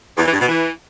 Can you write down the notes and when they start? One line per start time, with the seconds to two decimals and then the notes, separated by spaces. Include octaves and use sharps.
0.18 E2
0.25 E3
0.33 G2
0.41 B2
0.48 E3